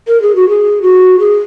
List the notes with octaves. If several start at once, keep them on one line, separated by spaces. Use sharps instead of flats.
A#4
G#4
F#4
G#4
F#4
G#4